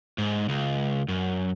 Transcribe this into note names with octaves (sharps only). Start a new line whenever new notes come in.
G#2
C#2
F#2